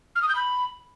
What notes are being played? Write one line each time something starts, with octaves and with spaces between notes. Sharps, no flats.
F6
D#6
G6
B5